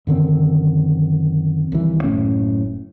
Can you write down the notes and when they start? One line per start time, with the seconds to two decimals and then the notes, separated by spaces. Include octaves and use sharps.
0.07 F#2 D3 D#3 C4
1.72 C2 D#3 E3
2.04 F#1 A2 C#4